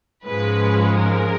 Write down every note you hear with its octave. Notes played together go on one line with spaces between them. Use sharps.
G#2 F3 G#3 C#4 B4
A#4